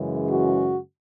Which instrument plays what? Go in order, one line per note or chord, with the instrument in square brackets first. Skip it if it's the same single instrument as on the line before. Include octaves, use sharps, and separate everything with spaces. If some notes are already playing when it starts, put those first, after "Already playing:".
Already playing: [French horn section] F#2 C#3 E3 G#3
F#4